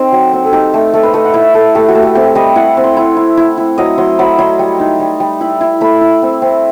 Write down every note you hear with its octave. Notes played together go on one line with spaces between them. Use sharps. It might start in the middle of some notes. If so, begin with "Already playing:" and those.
Already playing: C4 D#4 A4
F#3
C4
A4
D#4 G4
A3 G4
A3 A4
B4
A3 D#5
F#5
E4 E5
A3 A4
A3 G4
F#4
A3
G4
C4 G4
G3 D#5
E4 F#5
C4
C6
E4
E4
E4
E4
F#3 D#5
F#3 C6
F#3 B5
F#3 C6
G3
D#4
G3
G3
E4 B5
E4
A3 B5
E4
C4
C4